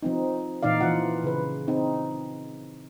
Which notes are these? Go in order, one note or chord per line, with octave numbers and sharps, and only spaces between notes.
F3 C4 D#4
A#2 E3 D#4 D5 F5
E3 F3 F4 F#5
C#3 B4
C4 D#4